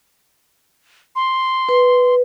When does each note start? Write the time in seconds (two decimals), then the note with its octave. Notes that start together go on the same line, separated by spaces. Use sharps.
1.16 C6
1.69 B4